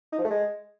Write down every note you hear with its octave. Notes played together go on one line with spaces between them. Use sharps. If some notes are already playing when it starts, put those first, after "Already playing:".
D#4
F3
A3
G#3